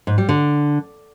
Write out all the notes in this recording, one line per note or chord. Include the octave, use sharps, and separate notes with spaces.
G#2
G3
D3